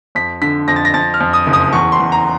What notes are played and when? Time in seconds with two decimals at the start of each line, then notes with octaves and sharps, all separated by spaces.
0.15 F2 B6
0.42 D3 B6
0.68 F2 A#6
0.76 A6
0.85 A#6
0.94 F2 A6
1.14 F6
1.20 F2
1.33 D#6
1.47 F#1
1.53 D#6
1.73 E2 C#6
1.92 C6
1.99 E2
2.12 A#5